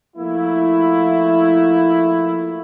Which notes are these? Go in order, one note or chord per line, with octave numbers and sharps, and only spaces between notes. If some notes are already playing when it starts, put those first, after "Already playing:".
F3 A3 A#3 E4